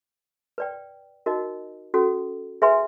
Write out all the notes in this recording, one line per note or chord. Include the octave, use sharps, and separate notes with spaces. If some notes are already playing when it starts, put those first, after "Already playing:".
B4 D5 G5
D#4 F#4 A#4 D#5
C#4 F#4 A4
G#4 B4 E5 G#5 C6